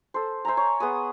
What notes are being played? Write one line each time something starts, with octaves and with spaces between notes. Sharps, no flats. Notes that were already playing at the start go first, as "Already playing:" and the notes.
A4 C5
C5 E5 G#5 A#5
C#5
B3 G#4 B4 D#6